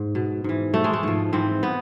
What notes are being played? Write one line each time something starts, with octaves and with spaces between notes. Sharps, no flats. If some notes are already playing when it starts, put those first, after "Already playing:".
Already playing: G#2
B2
G#2 E3
B2 A3
G#3
A3
G#2 F3
G#2 E3 C4
B3